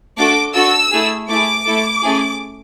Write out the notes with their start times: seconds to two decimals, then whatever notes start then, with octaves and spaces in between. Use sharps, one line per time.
0.18 A3 D4 F#4 A4 D6
0.55 D4 F#4 A4 E6
0.92 A3 E4 G#4
1.28 A3 E4 G#4 D6
1.65 A3 E4 A4
2.03 A3 C#4 E4 G#4